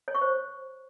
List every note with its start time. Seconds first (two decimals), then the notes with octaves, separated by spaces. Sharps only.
0.08 C#5
0.15 C#6
0.21 C5